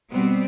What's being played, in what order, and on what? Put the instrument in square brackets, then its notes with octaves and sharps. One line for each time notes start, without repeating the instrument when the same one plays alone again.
[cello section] B2 G3 B3 C4